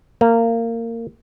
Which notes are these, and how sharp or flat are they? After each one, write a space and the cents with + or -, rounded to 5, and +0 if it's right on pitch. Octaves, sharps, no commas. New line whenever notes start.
A#3 -20